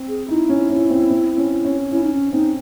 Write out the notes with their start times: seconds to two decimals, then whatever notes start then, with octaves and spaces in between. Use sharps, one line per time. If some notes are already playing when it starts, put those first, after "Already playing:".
Already playing: C4
0.08 G#4
0.28 D#4 E4
0.49 C#4
0.70 C#4
0.90 C4
1.10 C4
1.38 C#4
1.65 C#4
1.91 C#4 E4
2.03 D#4
2.13 C#4
2.32 C4 D#4